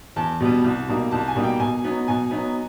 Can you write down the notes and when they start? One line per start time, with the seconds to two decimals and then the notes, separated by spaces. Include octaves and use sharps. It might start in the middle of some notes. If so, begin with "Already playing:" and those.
0.16 E2 A5
0.40 B2 G3 B3
0.64 C2
0.88 B2 G3 A#3 D#4
1.11 C2 A5
1.28 G#5
1.35 B2 G3 A#3 D#4
1.43 G5
1.60 B2 G#5
1.84 F#3 B3 D#4
2.08 B2 G#5
2.31 F#3 B3 D#4